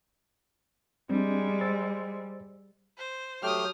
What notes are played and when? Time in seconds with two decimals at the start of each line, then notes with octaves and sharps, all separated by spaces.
1.10 G3 G#3 C4 D4
1.61 C5 E6 A6
2.98 C5
3.43 F#3 A3 G4 G5 D#6 F6